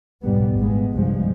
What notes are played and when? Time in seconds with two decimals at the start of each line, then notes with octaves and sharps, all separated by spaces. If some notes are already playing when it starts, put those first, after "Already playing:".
0.22 B1 F2 G#2 G3 B3
0.58 G#1 A#2 G#3 B3
0.90 G1 C2 G2 F3 G#3